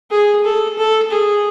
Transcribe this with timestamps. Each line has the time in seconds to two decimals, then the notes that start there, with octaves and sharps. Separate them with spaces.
0.11 G#4
0.44 A4
0.78 A4
1.11 G#4